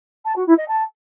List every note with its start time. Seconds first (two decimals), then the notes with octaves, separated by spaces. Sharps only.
0.25 A5
0.35 F#4
0.46 E4
0.57 D#5
0.68 A5